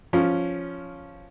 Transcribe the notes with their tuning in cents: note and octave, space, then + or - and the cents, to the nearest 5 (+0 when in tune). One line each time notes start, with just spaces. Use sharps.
F3 +0 C#4 +0